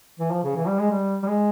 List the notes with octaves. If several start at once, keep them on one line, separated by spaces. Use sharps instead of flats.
E3
F3
C#3
E3
G3
G#3
G3
G3
G#3